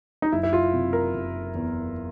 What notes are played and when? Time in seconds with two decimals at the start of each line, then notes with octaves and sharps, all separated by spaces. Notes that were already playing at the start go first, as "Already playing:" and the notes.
0.22 D#4
0.32 F#1 E4
0.43 E4
0.53 F4
0.74 C3
0.93 A#4
1.14 F#1
1.55 E2